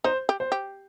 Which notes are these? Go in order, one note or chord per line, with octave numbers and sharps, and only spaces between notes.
D#4 C5
G4
C5
G4